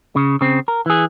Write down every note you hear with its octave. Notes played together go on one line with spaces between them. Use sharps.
C#3
C#3 C4
A#4
E3 G#4